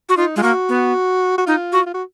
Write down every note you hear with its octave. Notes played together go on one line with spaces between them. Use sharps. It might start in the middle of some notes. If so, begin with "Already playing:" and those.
F#4
D#4 F4
G#3 F4
A#3 F#4
B3
F#4
D#4 F4
F#4
F4
F#4